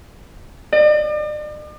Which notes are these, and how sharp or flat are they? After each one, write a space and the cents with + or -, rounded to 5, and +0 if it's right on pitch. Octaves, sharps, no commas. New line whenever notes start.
D5 +45